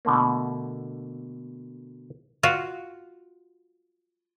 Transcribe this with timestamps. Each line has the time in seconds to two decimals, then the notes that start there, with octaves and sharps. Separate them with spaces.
0.05 B2 D3 A3 A#3
2.43 F4 F#4